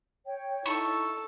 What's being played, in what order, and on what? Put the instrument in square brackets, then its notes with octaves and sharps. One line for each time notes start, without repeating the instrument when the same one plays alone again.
[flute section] C#5 G5
[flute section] D#4 E4 [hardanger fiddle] A4 [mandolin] C#6